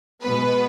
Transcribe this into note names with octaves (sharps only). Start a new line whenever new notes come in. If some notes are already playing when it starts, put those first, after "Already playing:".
B2 G#3 B3 B4